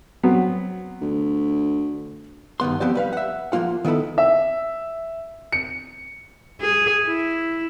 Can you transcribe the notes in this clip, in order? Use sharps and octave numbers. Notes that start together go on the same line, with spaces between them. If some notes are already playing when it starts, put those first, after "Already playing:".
F#3 B3 C4
D2
G2 D#3 B3 C6
F3 B3 C4 G4 D5
G3 B4 F5
E5 F#5
F3 G#3 A#3 F4 F#5
D#3 B3 E4 A4 B5
E5
C#7
G#4
E4